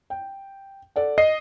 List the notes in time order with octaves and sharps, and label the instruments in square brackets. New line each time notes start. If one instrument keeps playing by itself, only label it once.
[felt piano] G5
A4 D5 F#5
[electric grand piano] D#5 [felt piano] C7